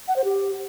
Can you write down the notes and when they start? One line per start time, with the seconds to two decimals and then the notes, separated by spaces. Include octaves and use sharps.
0.08 F#5
0.16 C5
0.24 G4